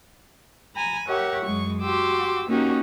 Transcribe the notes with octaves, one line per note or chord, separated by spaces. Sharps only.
G#5 A#5 B5
G4 A#4 C#5 E5 F#5 C#6
F#2 G#3 C#6
F#4 G4 C6 D6 E6
A#3 C#4 D#4 F#4 G4